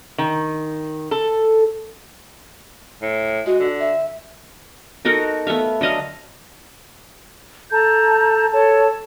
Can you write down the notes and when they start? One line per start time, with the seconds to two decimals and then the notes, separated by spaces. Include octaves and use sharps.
0.18 D#3
1.11 A4
3.02 A2
3.46 G#3 F#4
3.60 D3
3.80 E5
5.05 D#4 F#4 A4 A#4
5.47 A3 B3 E5 F5
5.81 D3 F#3 D#5 F5
7.72 A4 A5 A#5 G6
8.52 A4 C#5 A5